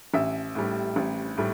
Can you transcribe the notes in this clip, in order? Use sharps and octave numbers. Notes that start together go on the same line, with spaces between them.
A1 E5
A2 G3
A1
A2 G3